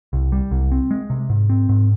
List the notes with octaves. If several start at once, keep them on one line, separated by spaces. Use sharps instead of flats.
C2
G3
C2
C4
G#3
C3
G#2
C4
G#2